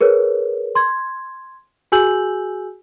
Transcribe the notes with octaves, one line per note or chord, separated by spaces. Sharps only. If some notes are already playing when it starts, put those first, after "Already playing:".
G#4 A#4 B4 C#5
C6 G#6
F#4 G#4 G#5 E6 G6 F#7